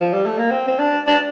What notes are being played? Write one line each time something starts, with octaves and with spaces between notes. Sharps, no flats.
F3
G3
A3
A#3
C4
C4
D4
D4